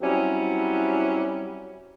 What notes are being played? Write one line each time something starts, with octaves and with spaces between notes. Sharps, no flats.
F#3 G3 C4 C#4 E4